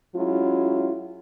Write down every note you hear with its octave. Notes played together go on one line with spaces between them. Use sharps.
F#3 G#3 C#4 E4 F4